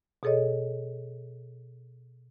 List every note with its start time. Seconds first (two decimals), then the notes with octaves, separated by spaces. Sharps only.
0.23 B2 G#4 A4 C#5 D#5